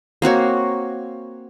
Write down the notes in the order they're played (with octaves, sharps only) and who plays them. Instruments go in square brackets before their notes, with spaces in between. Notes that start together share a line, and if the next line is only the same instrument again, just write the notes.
[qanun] A#3 C4 F#4 C#5